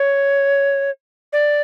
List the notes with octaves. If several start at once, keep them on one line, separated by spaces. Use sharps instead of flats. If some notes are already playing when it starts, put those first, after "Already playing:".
Already playing: C#5
D5